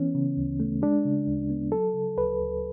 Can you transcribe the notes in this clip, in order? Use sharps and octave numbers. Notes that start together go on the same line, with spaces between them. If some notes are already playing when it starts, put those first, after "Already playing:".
Already playing: E3 B3 C#4
C#3
D2
A3
G#3 D4
C#3
D2
B3
F#3 A4
C#3
D2 B4
D2